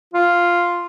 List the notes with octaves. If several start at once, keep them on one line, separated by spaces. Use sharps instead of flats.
F4